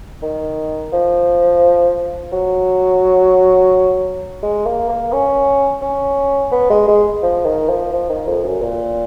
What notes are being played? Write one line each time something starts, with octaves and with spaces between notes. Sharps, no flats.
D#3
F3
F#3
G#3
A#3
A#3
C#4
C#4
B3
G#3
G#3
F3
D#3
F3
F3
D#3
F2
F#2
A#2